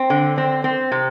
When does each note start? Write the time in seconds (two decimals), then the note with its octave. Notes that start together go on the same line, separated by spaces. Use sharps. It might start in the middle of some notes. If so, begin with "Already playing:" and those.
Already playing: C4
0.10 D3
0.38 C4
0.64 C4
0.92 C3